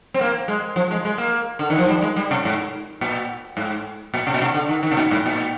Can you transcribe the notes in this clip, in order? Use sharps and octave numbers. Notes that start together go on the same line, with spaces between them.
C4
A#3
G#3
F3
G#3
G#3
A#3
D3
D#3
F3
G3
G#3
G3
C3
G#2
A#2
G#2
A#2
C3
A#2
C3
D3
D#3
D#3
C3
A#2
G#2
A#2